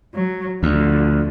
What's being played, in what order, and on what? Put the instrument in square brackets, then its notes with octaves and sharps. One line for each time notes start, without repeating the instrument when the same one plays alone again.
[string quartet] F#3
[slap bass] D2 [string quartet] D3 F3